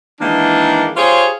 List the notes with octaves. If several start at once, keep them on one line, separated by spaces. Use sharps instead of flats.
D#3 E3 G#3 A#3 D4
F4 G4 G#4 C5 C#5